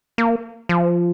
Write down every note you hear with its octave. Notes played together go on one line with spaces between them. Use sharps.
A#3
F3